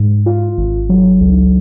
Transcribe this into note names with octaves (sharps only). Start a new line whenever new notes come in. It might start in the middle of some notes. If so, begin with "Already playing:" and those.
Already playing: G#2
F4
G#1
F#3
C#2